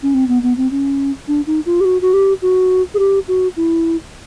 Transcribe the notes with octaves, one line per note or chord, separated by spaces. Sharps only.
C#4
C4
B3
B3
C4
C#4
D4
D#4
F4
G4
F#4
F#4
G4
F#4
G#4
G4
F#4
E4